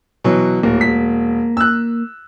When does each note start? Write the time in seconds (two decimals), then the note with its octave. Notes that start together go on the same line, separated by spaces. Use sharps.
0.24 B2 E3 F#3
0.63 D1 A#3
0.81 E1 B6
1.57 E6 F#6